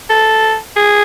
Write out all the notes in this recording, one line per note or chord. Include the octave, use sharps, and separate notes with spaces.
A4
G#4